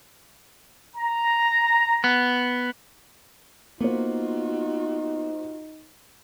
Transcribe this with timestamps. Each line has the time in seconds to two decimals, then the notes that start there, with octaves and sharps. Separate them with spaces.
0.96 A#5
2.04 B3
3.80 A#3 B3 D#4 F4 F#4 C5